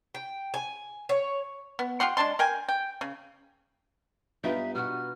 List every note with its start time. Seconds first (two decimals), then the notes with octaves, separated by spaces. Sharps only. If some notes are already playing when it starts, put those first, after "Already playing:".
0.15 G5
0.54 G#5
1.09 C#5
1.79 B3
2.00 F4 G4 F#5 C6
2.17 G#3 D4 A5 C6
2.39 A#4 G5 G#5
2.68 G5
3.01 C#3
4.44 G2 B3 D#4 F4 B4 E5 G5
4.75 B2 F#4 F6